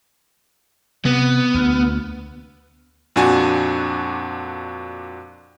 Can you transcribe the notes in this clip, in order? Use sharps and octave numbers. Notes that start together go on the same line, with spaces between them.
C3 B3
D2
F2 A#2 D4 F#4 G#5